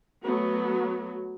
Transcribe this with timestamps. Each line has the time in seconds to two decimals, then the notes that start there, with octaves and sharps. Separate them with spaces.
0.23 F#3 A3 B3 F#4